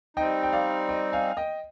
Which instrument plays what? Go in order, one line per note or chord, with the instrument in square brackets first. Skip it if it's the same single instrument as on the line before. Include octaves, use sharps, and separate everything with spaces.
[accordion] G3 C4 D#4 [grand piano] D#5 G5
[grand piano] G5
D5 F5
D#5 G5
F5 G#5
D#5 G5